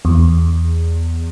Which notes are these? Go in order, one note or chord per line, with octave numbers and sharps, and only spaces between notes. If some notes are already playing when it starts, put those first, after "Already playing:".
E2